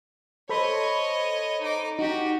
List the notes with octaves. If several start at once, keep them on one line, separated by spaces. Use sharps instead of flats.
A4 C5 C#5 D#5 B5
D#4 D6
D#4 F#4 G4